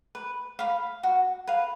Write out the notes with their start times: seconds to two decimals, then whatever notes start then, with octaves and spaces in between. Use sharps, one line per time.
0.15 B4
0.59 F5 B5
1.03 F#4
1.47 B4 F5